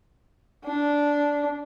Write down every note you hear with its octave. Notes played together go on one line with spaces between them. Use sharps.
D4